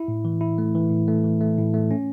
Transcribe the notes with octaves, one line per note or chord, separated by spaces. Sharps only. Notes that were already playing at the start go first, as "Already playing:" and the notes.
Already playing: E4
A2
E3
E4
A3
E3
A2
A3
E3
A3
A2
A3
C#4